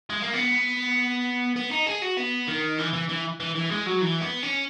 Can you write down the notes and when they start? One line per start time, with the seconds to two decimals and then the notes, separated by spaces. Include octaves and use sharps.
0.10 G#3
0.22 A#3
0.34 B3
1.56 B3
1.71 D#4
1.87 G#4
2.02 F#4
2.17 B3
2.48 D#3
2.79 E3
2.94 E3
3.09 E3
3.40 E3
3.55 E3
3.70 G#3
3.86 F#3
4.01 E3
4.22 B3
4.43 C#4